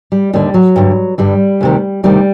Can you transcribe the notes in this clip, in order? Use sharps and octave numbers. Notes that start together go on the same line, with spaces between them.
G3
D#2 D3 G3
F#3
G2 D3
G2 D3 G3
D2 C3 D#3
D2 C3 D#3 G3